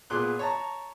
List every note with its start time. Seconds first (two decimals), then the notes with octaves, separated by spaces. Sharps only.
0.10 A#2 B3 G#4 C6 D6 F#6
0.39 C#5 A5 A#5